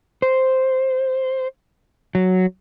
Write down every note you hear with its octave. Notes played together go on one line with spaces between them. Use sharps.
C5
F#3